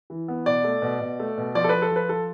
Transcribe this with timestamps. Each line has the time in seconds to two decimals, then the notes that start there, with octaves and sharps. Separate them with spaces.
0.10 E3
0.28 B3
0.46 B2 D5
0.64 A3
0.82 B2
1.00 B2
1.20 A3
1.38 B2
1.55 F3 D5
1.64 A4
1.69 F3 B4
1.82 A4
1.91 F3 B4
2.09 F3 A4